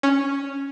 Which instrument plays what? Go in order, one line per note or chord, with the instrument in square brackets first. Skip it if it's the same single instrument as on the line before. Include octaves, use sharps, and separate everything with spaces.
[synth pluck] C#4